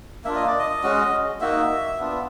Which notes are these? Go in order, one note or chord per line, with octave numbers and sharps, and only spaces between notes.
A#3 D4 F4 E5
D#5
D5
D#5
G#3 C#4 F#4
A#3 D#4 F#4 E5
B3 D4 F4